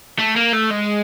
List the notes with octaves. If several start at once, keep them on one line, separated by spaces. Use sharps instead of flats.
A3
A#3
A3
G#3